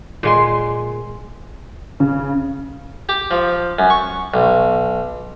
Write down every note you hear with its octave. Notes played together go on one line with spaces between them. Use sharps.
A#2 G#3 C6
C#3
G4
F3
F#2
C#6
B1